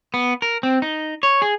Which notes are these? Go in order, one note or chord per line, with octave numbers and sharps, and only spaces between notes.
B3
A#4
C4
D#4
C#5
G#4